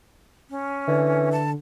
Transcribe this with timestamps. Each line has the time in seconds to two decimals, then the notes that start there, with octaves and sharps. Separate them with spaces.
0.50 C#4
0.87 D3 E3
1.32 A5